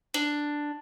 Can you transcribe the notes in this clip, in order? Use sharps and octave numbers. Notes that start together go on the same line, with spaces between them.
D4